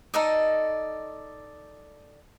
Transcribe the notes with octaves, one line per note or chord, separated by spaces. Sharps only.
D#4 A4 D5 D#5